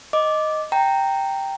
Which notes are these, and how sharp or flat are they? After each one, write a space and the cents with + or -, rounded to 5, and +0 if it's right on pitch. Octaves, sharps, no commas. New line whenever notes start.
D#5 +0 D6 +0
G5 +0 A#5 -15